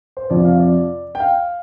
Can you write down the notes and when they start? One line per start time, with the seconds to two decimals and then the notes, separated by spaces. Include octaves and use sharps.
0.17 C5
0.30 F2 C3 F3 D5
0.45 F5
0.59 D5
1.15 G5
1.20 F5